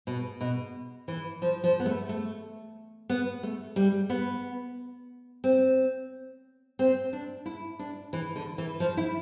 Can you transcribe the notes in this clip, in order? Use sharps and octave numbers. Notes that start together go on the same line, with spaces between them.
B2
B2
E3
F3
F3
B3
A3
A3
B3
A3
G3
B3
C4
C4
D4
E4
D4
E3
D3
E3
F3
E4